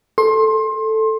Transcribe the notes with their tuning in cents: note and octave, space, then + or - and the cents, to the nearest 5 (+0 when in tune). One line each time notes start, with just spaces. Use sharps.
A4 +0 C6 +25